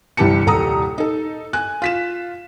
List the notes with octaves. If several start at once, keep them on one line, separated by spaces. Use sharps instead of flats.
G1 C2 E3 G4 A5 C#7
D#1 C2 A4 A#5 D#6
D#4 A4
G#5 F#6
F4 B6 E7